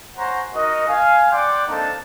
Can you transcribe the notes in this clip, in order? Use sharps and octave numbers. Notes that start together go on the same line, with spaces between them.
C5 C#5 F#5 G#5 A#5 C6
D#4 F#4 A#4 D#5
F5 G#5
D5 F#5 G5 C6 D6
A#3 C4 D4 D#4 A4 A5